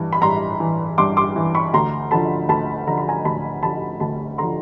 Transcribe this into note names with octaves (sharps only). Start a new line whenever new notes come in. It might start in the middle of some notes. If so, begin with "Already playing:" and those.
Already playing: G2 E3
B5
G2 A#5 C6
E3
G2 C6 D6
C6 D6
E3
B5 C#6
D2 A#5 C6
D3 F3 A5 B5
D2 A5 B5
D3 F3 A#5
B5
G#5 A#5
D2 A5 B5
D3 F3 A5 B5
D2 A5 B5
D3 F3 A#5 C6